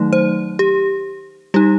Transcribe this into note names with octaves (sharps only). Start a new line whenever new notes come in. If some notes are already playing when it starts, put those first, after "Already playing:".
Already playing: D#3 F#3 A3 D#4
C5
G4
G3 D#4 G4